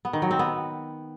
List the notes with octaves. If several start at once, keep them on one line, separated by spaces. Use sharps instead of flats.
B3
D#3
F#3
C4
B3